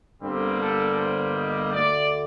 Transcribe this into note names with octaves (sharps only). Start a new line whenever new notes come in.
G1 G2 D3 G3 A#3 C4
A4
C5
D#5
D2 D3 A3 D5